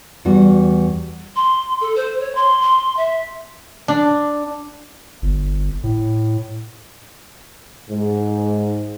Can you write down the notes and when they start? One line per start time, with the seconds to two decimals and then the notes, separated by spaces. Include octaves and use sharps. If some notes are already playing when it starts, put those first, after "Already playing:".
0.25 E2 G3 F#4
1.36 C6
1.81 A4
1.96 C5
2.20 C#5
2.35 C6
2.62 C6
2.97 E5
3.88 D4
5.22 G1
5.83 A2
7.89 G#2